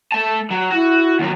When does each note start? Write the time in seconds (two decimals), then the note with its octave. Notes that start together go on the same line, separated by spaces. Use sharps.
0.12 A3 A5
0.51 F#3
0.71 E4 F#4
1.19 D#2 F#3